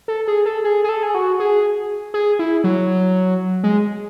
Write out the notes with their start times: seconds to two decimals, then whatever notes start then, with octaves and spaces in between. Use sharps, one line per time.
0.08 A4
0.28 G#4
0.46 A4
0.64 G#4
0.84 G#4
0.89 A4
1.03 G#4
1.15 F#4
1.40 G#4
2.14 G#4
2.39 E4
2.64 F#3
3.64 G#3